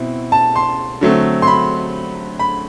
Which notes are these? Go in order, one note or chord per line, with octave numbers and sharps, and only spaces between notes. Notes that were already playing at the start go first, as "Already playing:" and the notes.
Already playing: B2 C4 E4
A5
C6
D3 F#3 A3 C4
C6
B5
B5